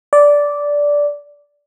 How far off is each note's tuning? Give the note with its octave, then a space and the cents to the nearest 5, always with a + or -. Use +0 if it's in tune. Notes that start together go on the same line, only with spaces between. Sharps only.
D5 -10